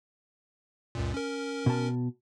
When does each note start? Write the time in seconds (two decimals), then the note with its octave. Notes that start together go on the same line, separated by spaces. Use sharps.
0.95 C#2 F#2 A#2
1.14 C#4 A#4
1.66 B2 A5